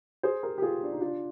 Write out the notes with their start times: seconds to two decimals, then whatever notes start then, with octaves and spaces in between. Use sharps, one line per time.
0.23 G#4 C5
0.43 G4 A#4
0.58 G4
0.62 F4 G#4
0.83 D4
0.92 D#4
1.01 D4 F4